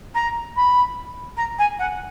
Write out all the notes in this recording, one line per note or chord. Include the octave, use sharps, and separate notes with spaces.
A#5
B5
A#5
G#5
F#5